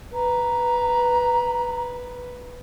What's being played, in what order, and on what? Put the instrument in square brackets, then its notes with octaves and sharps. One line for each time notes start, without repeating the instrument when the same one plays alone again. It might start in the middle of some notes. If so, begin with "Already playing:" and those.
[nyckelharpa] B4 [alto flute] A#5